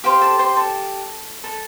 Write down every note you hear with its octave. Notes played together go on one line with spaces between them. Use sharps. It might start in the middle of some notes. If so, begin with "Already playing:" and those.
G4 C5 F5
A4 A5
C5 C6
A4 A5
A4 A5